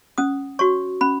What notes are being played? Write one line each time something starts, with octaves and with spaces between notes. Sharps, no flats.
C#4 D#6
F#4 C#5 C#6
C#4 B5